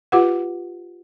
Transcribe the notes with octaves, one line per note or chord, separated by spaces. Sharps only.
F4 G4 B4 F#5